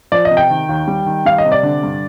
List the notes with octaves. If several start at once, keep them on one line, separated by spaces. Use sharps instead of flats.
F3 D5
D#5
C3
G5
D#3
D#2
G3
D#3
G3 F5
D#5
C3
D5
D3
G2